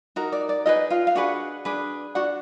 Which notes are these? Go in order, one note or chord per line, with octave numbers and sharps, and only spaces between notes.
D#4 F#4 A#4
D5
D5
D#4 F4 G#4 B4 D#5
F4 F5
F5
D4 F#4 G#4 B4 F#5
D4 G#4 B4
D4 F#4 F#5